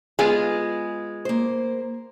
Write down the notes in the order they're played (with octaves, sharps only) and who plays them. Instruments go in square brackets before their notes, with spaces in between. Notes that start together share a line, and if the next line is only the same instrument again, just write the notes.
[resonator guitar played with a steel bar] G#3 [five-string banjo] B3 F4 G#4
[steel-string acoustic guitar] A#3 C5